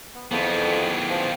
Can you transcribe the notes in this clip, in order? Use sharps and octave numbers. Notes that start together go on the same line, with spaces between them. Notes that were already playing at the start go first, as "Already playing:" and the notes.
B3
F2 D#3 E3 B3 G#4 G5
F3